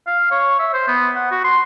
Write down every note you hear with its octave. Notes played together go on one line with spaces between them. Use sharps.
F5
C#5
E5
C5
B3
F#5
F#4
C6